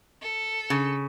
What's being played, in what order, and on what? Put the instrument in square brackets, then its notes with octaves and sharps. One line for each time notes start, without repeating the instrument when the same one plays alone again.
[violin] A4
[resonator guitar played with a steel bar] C#3